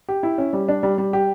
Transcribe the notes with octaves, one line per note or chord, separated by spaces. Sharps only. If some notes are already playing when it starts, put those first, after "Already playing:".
G4
E4
C#4
G3
D4
G3
G3
G4